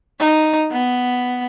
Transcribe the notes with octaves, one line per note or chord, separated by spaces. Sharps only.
D#4
B3